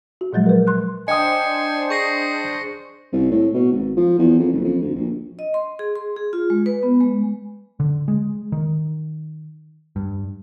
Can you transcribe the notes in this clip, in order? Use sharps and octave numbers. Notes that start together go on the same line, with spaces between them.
F#4
A#2 F3 F#3 G#3
A#4 B4
C6 F#6
D4 C5 D#5 G5 G#5 D#6 C#7
G#4 C#6 A#6 C7
C2
A2
B2
G#1
F3
E2
F2
F#1
F2
D2
A#1
D#5
C6
G#4
C6
G#4
F4
G#3
B4
B3
G#3
D3
G#3
D#3
G2